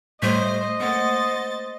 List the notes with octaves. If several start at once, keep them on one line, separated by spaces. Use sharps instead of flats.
A2 G3 A3 C5 D#5
A3 A#3 C5 F#5 A6